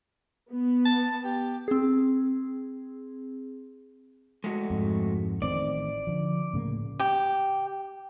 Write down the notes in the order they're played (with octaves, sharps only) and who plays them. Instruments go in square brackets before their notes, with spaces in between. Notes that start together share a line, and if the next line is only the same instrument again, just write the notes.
[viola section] B3
[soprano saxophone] A5
G4
[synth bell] C4 G#4
[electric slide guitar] G#3 A3 F#4
[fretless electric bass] F2 G#2
[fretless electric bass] A1 D#3 C4 [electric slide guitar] D5
[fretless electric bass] D3 F3
A2 C#3 A#3
[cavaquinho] G4